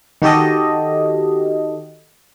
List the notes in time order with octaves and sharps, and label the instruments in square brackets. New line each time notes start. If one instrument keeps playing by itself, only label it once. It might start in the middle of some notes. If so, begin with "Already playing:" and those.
[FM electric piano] D#3 F#4 G4 A4 D#5